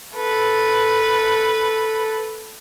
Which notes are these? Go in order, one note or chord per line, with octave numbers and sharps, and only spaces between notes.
A4 B4